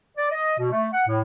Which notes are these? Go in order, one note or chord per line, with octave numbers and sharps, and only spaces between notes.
D5
D#5
B2
A3
F#5
A2